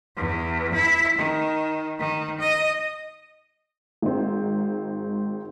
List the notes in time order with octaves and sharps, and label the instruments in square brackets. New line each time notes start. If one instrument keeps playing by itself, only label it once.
[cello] E2
E4
D#3
D#3
D#5
[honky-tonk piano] G#1 G#2 C4